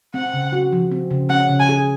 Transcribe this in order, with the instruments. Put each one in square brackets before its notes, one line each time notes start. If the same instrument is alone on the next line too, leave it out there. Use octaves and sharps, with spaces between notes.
[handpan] C4 [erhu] F#5
[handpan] C#3
F#4
F3
C4
C#3
[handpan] C#4 [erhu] F#5
[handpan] C#3
[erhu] G#5
[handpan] G#4